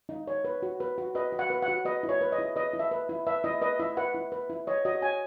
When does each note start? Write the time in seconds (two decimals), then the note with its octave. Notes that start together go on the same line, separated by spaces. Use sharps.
0.09 D#4
0.27 C#5
0.45 B4
0.62 F#4
0.80 B4
0.98 F#4
1.15 B4 D#5
1.32 F#4
1.39 F#5
1.50 B4
1.62 F#5
1.68 F#4
1.85 B4 D#5
2.03 E4
2.09 C#5
2.21 B4
2.32 D#5
2.39 E4
2.56 B4 D#5
2.73 E4
2.79 E5
2.91 B4
3.09 E4
3.27 B4 E5
3.44 E4 D#5
3.62 B4 D#5
3.79 E4 E5
3.97 B4 F#5
4.14 E4
4.32 B4
4.50 E4
4.67 C#5 D#5
4.85 F#4 D#5
5.02 C#5 G#5